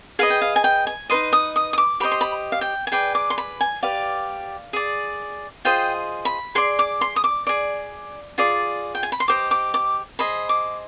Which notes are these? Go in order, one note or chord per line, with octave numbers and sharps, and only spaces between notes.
G#4 B4 D#5 F5
G5
F5
G#5
G5
G#5
D#4 B4 D#5 C6
D#6
D#6
D#6
D6
G4 C5 D#5 B5
C6
B5
F5
G5
G#5
G#4 B4 D5 G5
D6
C6
B5
G#5
G4 B4 D5 F5
G#4 D5
F4 G#4 C5 D#5 G5
B5
G#4 D5 C6
D6
C6
D#6
D6
G#4 D5
F4 G#4 D5
G5
G#5
B5
C6
G4 C5 D#5 D6
D6
D6
G#4 C5 D#5 B5
D6